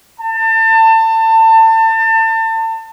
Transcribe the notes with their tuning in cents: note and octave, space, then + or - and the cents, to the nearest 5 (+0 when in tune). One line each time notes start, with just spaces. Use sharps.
A5 +30